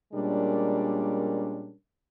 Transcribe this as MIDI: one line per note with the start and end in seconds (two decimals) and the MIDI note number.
0.13 1.73 46
0.13 1.73 55
0.13 1.73 56
0.13 1.73 61
0.13 1.73 62
0.13 1.73 70